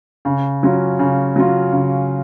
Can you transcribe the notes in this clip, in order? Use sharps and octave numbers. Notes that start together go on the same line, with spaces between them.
C#3
F#3 C#4 F4
C#3
F#3 C#4 F4
C#3